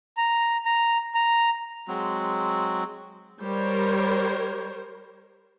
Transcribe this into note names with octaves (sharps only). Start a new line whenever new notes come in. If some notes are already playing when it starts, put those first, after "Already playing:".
A#5
A#5
A#5
F#3 G#3 C4 F#4
G3 A#4 C5 C#5